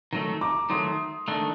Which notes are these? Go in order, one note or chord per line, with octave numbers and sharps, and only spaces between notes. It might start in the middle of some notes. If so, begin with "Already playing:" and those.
D#3 F#3 A3
A#5 D6
D#3 F#3 A3 C6 D#6
D#3 A3 D4